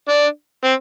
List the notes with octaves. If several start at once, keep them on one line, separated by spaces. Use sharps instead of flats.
D4
C4